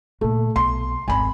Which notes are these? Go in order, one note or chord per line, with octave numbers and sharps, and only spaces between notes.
A#2 D3 A3
B1 C6
G#1 E2 G#5 B5